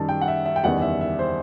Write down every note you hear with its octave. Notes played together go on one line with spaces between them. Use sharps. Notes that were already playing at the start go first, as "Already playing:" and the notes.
Already playing: F#2 D#3 G3 A5
G5
F#5
E5
E5
G5
F#1 E2 D#3 G3 F#5
E5
E5
C5